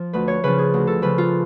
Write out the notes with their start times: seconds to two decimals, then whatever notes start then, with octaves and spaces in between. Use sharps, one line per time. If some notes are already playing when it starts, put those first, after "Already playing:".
Already playing: F3
0.13 D2 B4
0.28 C#5
0.43 C#3 F3 B4
0.58 G#4
0.74 D2
0.87 A4
1.02 C#3 F3 B4
1.18 F4